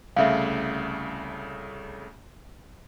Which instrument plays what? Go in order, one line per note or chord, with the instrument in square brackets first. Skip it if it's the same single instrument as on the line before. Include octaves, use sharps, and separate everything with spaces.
[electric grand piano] C2 C#3 A3 [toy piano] E5 F5